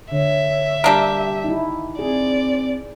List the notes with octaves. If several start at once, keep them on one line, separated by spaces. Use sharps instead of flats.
D3 C#5 E5
G3 A#3 D4 G4
D#4 E4
C4 G#4 D5